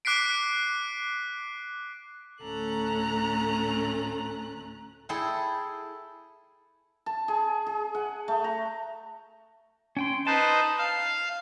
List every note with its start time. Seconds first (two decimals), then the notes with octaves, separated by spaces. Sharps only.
0.05 D6 F#6 B6 C7 D7
2.43 D2 A2 C#4 A4 A#5 F#6
5.09 E4 G#4 A4 G5 A5 C6
7.06 A5
7.28 G#4
7.67 G#4
7.95 F#5
8.28 A3
8.44 A#5
9.97 C#4 G5 C6
10.27 D#4 B4 C5 A5
10.78 F5